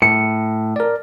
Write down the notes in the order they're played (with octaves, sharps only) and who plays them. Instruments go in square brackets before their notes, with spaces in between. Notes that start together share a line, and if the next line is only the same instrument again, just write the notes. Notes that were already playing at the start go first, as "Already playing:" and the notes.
[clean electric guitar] A2 [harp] C#7
[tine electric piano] A#4 D5